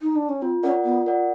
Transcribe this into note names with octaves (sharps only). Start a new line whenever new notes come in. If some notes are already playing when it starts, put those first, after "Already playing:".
D#4
D4
C#4
C4 F4
C#4 A#4 D5 F#5
B3 F4
A#4 D5 F#5